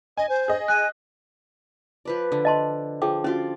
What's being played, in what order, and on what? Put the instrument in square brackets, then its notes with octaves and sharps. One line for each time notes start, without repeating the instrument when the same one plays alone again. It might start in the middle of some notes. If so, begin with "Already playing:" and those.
[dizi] D#5 [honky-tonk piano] G#5
[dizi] C5
[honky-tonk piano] G#4 D#5
[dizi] G#5 [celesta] F#6
[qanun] F3 B4 D5
D3
[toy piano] D#5 A5 C6
[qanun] F3 [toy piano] G#4 G5 D6
[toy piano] C#4 F#4 [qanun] F4 D5